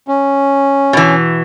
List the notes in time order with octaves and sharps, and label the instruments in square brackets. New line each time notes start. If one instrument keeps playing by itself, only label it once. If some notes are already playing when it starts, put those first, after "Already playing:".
[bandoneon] C#4
[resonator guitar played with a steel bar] B2 E3